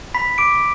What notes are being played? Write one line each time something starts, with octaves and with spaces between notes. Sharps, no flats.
B5 B6
D6 D7